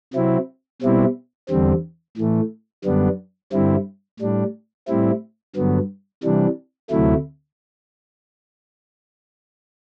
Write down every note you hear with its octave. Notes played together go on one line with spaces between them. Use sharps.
C3 F#3 C4 E4
B2 G3 C4 E4
E2 D3 G3 C4
A2 E3 A3
F#2 D3 G3 B3 D4
G2 D3 G3 C4 E4
A2 G3 D4
A2 G3 C4 E4
G2 D3 F#3 B3
C3 E3 G3 D4
D2 C3 F#3 A3 E4